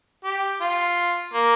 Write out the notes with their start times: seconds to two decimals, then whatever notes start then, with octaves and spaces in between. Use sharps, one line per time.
0.24 G4
0.61 F4
1.34 A#3